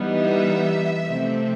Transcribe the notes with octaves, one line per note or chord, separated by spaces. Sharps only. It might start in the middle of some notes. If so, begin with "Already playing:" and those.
Already playing: E3 G3 B3 D#4
E5
C3 F3 A3 C4